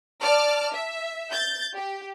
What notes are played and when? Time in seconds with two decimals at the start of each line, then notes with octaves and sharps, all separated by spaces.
0.21 D5 A5 D6 F6
0.73 E5
1.31 G6 A6
1.75 G4